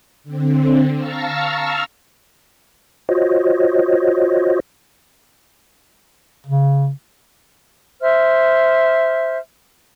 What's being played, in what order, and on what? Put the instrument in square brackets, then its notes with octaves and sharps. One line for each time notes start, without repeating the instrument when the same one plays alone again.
[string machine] D3 C4
F5 A5 A#5 C#6 E6 F6
[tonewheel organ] F4 F#4 C5 C#5 D#5
[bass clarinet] C#3
[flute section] C5 E5 F6